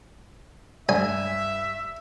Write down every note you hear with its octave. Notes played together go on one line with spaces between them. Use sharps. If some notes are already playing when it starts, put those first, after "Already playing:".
G2 D5 E5 G#5